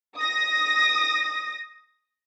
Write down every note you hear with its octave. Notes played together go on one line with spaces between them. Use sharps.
D#6 A#6